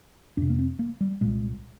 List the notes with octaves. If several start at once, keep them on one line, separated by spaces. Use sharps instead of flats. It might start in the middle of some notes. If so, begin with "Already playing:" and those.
F2 C3 D4
A#3
C4
A#3
G3
C2 A#2 G#3